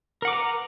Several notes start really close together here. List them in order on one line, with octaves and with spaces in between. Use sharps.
A#4 F#5 D6 B4 A#5